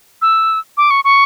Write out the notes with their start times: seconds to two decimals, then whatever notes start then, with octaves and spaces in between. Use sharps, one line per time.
0.22 E6
0.77 D6
0.91 C#6
1.05 C#6